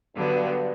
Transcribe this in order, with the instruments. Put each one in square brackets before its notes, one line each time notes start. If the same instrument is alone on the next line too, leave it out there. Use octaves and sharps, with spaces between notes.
[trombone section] G2 [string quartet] D3 F#3 B3